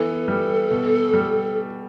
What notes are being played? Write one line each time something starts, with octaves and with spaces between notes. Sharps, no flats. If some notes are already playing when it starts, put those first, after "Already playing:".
Already playing: E3 B3 A4
G3
B2
G3